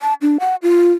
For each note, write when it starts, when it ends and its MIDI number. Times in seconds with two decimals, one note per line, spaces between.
0.01 0.14 81
0.22 0.37 62
0.40 0.55 78
0.63 0.93 65